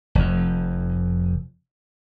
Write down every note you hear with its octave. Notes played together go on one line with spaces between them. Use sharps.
F1 F2